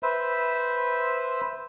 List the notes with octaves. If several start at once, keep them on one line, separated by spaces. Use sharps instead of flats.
B4 C5 E5